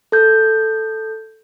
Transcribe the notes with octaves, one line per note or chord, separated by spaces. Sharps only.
A4 G6